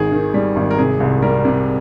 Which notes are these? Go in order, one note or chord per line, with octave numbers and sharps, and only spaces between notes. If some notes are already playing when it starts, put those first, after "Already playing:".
Already playing: G#1 D#3 G#4
D#3
G3
G#1
A#4
C3 G#4
C2
G3 A#4
C3